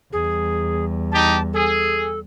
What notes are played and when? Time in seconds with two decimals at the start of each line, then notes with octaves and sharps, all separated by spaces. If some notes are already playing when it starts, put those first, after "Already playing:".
0.13 E2 G3 G#4
1.12 D#4 G4 A5
1.53 G#4 A4